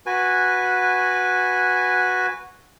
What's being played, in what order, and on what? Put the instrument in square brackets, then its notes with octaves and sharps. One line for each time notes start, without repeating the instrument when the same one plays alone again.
[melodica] F#4 B4 G#5